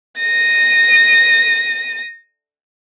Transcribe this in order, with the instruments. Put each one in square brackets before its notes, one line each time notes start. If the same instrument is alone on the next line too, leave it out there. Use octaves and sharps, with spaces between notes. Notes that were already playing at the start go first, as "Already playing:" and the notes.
[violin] A#6 D#7